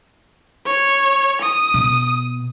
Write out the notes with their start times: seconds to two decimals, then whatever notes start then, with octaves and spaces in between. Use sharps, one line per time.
0.66 C#5
1.41 D#6
1.74 B2